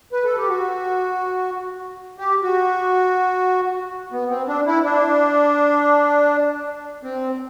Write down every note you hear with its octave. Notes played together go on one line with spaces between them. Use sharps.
B4
A4
G4
F#4
G4
F#4
B3
C4
D4
E4
D4
C4